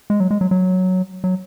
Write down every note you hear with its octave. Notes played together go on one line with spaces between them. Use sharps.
G#3
F#3
G#3
F#3
F#3
F#3